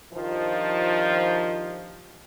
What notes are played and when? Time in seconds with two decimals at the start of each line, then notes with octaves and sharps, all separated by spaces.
0.12 G2 D#3 F3